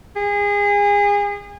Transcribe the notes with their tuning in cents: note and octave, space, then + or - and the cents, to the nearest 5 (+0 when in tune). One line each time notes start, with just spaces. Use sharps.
G#4 -30